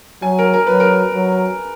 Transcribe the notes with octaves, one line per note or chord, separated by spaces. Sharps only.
F#3 G#5
A#4
A#4
F#3 B4
A#4
F#3